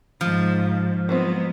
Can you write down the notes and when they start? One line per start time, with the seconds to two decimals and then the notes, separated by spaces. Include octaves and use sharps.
0.21 G#2 F3
1.09 F#3 G#3 B3 C4 F4